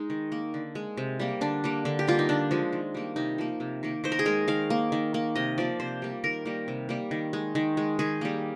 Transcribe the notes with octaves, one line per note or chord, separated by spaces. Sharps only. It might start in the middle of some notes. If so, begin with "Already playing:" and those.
Already playing: G#3 D#4
D#3
A#3
D3
G#3
C3
G3 A#3
D3 D4
G3 A#3
D3
G4
G3 A#3 F4
D#4
D3 D4
F3 G#3
D#3
G3 A#3
C3 D#4
F3 A#3
C3
D#3 A#3
D#3 C5
A#4
G#4
G#3 A#4
D#3 F5
A#3
D#3
A#3
C3 D#5
F3 A#3 D5
C3 C5
G3 A#3
D#3 A#4
G3 A#3
C3
G3 A#3
D#3
G#3
D#3
G#3
D#3 G#4
G3 A#3